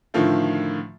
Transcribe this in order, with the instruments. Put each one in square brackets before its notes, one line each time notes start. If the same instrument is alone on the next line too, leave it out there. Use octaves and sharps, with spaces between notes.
[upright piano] A2 D3 D#3 F3 F4